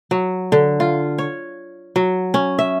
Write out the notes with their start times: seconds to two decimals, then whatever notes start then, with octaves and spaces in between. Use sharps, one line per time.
0.11 F#3
0.52 D3
0.80 F4
1.18 C#5
1.96 F#3
2.34 C#4
2.59 E5